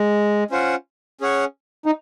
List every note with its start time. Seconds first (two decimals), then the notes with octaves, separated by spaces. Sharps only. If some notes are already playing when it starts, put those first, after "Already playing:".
Already playing: G#3
0.51 C#4 F4 C5 F#5
1.21 C#4 G#4 C#5 F#5
1.86 D#4